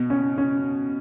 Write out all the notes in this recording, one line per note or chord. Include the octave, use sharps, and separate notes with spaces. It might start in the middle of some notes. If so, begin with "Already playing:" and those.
Already playing: B2
C#4
C#4